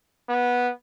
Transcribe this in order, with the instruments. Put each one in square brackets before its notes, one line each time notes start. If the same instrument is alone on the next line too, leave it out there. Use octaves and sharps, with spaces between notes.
[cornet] B3